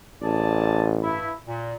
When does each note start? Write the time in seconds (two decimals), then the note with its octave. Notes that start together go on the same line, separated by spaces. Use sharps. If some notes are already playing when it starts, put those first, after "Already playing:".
0.22 A1 G#4 D5 A5
1.03 G2 E4
1.46 A#2